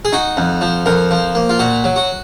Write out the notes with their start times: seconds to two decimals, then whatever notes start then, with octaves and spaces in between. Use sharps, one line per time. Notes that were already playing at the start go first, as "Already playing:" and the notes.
0.05 G#4
0.13 D#4 F#4
0.37 F2
0.61 F3
0.86 F2 A#4
1.11 F3
1.35 A#3
1.49 F4
1.59 A#2 F#4
1.84 F#3
1.96 F#4